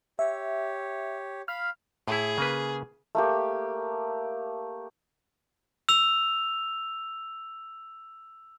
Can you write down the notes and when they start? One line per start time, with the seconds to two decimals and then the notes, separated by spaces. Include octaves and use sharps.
0.19 G4 C#5 E5
1.48 F5 B5 F6
2.08 A2 E4 G#4
2.38 C#3 A#3 B4
3.15 A3 A#3 G4
5.89 E6 F7